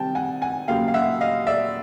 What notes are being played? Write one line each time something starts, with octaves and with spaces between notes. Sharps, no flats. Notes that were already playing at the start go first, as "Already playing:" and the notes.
Already playing: C3 D#3 G3 C4 G5 A5
F#5 G#5
F#5 G#5
D#2 C#3 F#3 A#3 F5 G5
F5
E5 F#5
D#5 F5
D5 E5